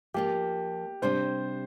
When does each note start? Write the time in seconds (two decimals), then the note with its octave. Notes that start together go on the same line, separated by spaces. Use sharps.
0.14 F3 A#3 F4 G4
1.02 C3 G3 D4 C5